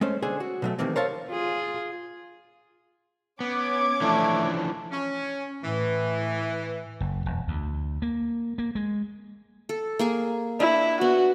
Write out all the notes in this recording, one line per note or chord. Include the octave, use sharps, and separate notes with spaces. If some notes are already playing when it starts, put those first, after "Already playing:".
G#3 A3 C#4 C5
D3 G#4 C5 G#5
F#4
B2 F#3 A3
C3 D#3 E3 A3 A#3 C4
A#4 C5 C#5 E5 F5 A5
F4 G#4
B3 C#4 D6 G#6
E3 F3 A3 D4
C#4
A2 E3
F#1
E1
D2
A#3
A#3
G#3
A4
A#3 G#4 G#5
D4 E4
B3 F#4